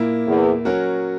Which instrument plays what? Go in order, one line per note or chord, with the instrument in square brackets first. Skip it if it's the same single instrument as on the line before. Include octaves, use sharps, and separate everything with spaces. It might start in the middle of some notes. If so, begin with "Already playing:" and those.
Already playing: [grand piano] A#2 A#3 E4
[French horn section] E2
[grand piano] F#3 C#4 F#4 A#4